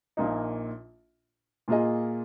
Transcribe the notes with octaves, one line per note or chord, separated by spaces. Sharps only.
A#1 A#2 A#3 D#4
A#2 A#3 F4 G#4 D#5